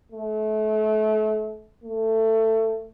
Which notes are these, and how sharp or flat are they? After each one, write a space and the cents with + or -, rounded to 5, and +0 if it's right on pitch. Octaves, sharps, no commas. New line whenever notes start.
A3 -30
A3 +20